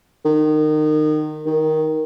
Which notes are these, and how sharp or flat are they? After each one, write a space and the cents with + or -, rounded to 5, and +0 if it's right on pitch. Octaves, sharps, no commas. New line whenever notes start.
D#3 -25
D#3 +5